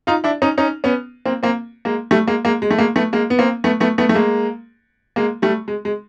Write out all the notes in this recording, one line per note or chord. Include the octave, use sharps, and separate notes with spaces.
D#4 F4
D4 E4
C#4 D#4
C#4 D#4
B3 C#4
A#3 C4
A#3 C4
G#3 A#3
G3 A3
G#3 A#3
G#3 A#3
G#3
A3
G#3 A#3
A3 B3
G#3 A#3
B3
A#3 C4
A3 B3
A3 B3
A3 B3
A3
G#3 A#3
G#3 A#3
G3 A3
G#3
G#3